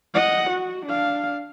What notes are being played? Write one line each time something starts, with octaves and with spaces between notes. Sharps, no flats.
D#5 F#5
F#4
D4 F5